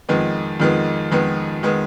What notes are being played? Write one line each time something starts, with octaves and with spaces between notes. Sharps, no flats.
F2 D#3 G#3 B3
F2 D#3 G#3 B3
F2 D#3 G#3 B3
D#3 G#3 B3